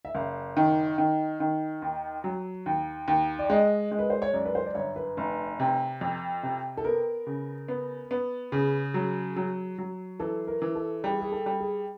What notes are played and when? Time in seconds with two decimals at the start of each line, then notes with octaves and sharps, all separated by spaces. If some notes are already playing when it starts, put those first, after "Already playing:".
0.05 E5
0.15 F#1 F5
0.57 D#3
0.98 D#3
1.40 D#3
1.82 D#2
2.24 F#3
2.66 D#2
3.08 D#2
3.39 D5
3.50 G#3 D#5
3.91 G#3
3.99 B4
4.10 C5
4.22 C#5
4.34 F#2 D5
4.45 B4
4.55 C5
4.66 D5
4.75 G1 C#5
4.96 B4
5.17 F1
5.60 C3
6.01 F2
6.43 C3
6.77 A4
6.84 B3 A#4
7.27 C#3
7.68 B3
8.11 B3
8.52 C#3 G#4
8.94 F#3
9.36 F#3
9.78 F#3
10.20 E3 A4
10.47 A#4
10.62 E3
10.75 A4
11.04 G3 G#4
11.21 G#4
11.32 A4
11.46 G3
11.60 G#4